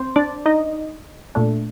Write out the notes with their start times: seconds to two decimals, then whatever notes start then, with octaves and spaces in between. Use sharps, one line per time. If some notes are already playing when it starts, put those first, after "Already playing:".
Already playing: C4 C5
0.16 D4 D5
0.46 D#4 D#5
1.35 A#2 A3 D4